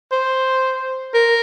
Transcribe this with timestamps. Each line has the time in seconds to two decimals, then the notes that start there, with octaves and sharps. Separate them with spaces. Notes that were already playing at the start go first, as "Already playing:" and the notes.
0.12 C5
1.14 A#4